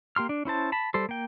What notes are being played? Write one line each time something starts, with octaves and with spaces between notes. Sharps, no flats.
A#3 G4 C6 F6
D4
C#4 E4 C5 A5
A5 B5
G3 A4 C5
A#3 G5